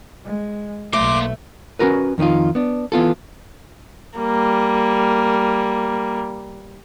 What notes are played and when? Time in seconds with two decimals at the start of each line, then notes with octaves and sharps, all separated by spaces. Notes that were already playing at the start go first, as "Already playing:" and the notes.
0.25 G#3
0.93 B1 F#3 A3 A#3 C6 D6
1.79 C#4 D#4 F#4 A#4 B4
2.18 F2 D#3 C#4 D#4 F4
2.55 B3 D4
2.92 E3 B3 F4 A4
4.18 G3 A#3